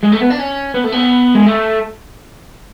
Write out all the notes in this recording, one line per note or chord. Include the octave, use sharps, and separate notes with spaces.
G#3
A3
B3
D4
C#4
B3
A3
B3
G#3
A3